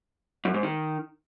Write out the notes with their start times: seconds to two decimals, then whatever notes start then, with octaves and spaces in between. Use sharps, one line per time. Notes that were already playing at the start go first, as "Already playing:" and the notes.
0.45 F#2
0.54 G#2
0.63 D#3